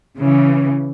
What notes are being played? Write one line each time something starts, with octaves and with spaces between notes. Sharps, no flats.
C#3 E3